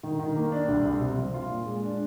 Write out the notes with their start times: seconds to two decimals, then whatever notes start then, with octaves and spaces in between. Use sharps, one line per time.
0.03 D#3
0.19 D#3
0.36 A#3
0.52 D4
0.68 C2
0.85 C2
1.01 C3
1.18 F3
1.34 F4
1.50 A#2
1.66 G#3
1.83 D4